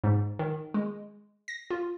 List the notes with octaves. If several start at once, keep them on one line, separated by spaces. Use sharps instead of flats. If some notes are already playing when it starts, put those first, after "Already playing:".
G#2
D#3
G#3
A#6
F4